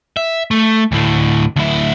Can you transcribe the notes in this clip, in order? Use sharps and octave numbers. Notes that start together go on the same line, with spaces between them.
E5
A3
D2 A2
D2 E4